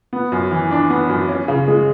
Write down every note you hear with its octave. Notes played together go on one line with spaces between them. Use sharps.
B3
F#2
E3
D4
B3
F#2
C#4
C#3
G#3